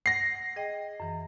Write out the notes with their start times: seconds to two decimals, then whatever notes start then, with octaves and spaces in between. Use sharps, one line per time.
0.06 F#5 A#6 C7
0.56 G#4 D#5 G5
1.00 F#2 E3